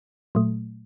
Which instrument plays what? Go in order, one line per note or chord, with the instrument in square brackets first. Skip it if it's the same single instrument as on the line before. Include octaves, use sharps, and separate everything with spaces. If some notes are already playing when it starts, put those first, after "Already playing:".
[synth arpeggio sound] A#2 F#3 A3